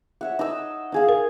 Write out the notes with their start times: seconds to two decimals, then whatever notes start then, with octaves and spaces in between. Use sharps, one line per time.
0.21 C#5 E5 F#5
0.39 D#4 D#5 E6
0.92 D#4 G#4 F5
1.09 A#4